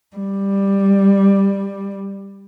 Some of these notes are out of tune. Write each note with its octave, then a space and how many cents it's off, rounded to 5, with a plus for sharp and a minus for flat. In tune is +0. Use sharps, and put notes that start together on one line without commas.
G3 +10